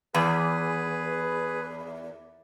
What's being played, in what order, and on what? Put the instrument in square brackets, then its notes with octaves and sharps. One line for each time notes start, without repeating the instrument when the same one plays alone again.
[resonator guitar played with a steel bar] E2 [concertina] G#4 B4